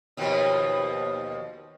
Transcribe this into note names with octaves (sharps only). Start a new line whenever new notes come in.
D#2 B2 F3